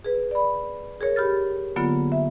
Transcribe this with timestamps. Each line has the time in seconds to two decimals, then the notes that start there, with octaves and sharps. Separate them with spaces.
0.04 G#4 B4
0.31 D5 B5
1.01 G#4 A#4 C#5
1.16 G4 B5 F6 A6
1.76 D3 F#3 A#3 B3 F4
2.12 E5